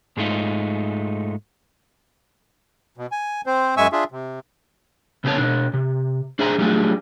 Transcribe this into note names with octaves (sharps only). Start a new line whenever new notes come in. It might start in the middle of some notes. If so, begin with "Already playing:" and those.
G#2 G#3 A3 D#4 F4
B2
G#5
C4 C5
F#2 G#3 E5 G#5 C#6 E6
D4 F4 G#4 E5
C3
C2 C#3 B3 F4 C#5 A5
B2 D4
C3
D4 G#4 C5 E5 G#5 A#5
F#3 G3 A3 D4 F4 G#4